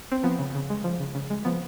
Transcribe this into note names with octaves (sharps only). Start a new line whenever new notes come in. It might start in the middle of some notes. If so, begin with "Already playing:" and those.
C4
F3 B3
C#3
C#3
G#3
F3
C#3
C#3
G#3
F3 B3